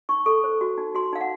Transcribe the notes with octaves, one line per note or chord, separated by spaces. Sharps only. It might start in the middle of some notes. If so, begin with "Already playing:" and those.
D#4 C#6
A4 C#6
C5
F#4
D#4
F#4 C6
D#4 F5
F#5